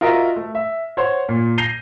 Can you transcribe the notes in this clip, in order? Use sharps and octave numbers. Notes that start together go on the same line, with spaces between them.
F4 F#4 A#4 D#5 E5
A3
E5
C5 C#5 F#5 C6
A#2
G6 A#6 C7 D#7 F7 G7